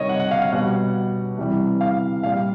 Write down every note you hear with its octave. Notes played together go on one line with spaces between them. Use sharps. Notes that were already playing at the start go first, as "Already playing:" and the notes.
Already playing: C3 D#3 G3 C#5 D#5
F#5
F#5
F5
F5
B2 G3 F#5
C3 E3 G3
F5
A#2 G3 F5